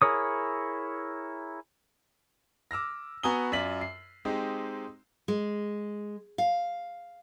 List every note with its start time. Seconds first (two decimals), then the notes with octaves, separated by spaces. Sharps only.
0.02 E4 G#4 A#4 C#5 D#6
2.71 D6 E6 F6 A#6
3.23 B3 F#4 G#5 A#5 D#6 G7
3.52 F#2 F4 D5 B6 F#7
3.81 C7
4.25 G#3 C4 D#4 G4
5.28 G#3
6.38 F5